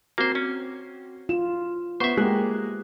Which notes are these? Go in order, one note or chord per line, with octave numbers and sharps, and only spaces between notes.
A#3 C4 F#4 C5
C#4
F4 E7
B3 C5 E5 C#6
G#3 A#3 G4 F#6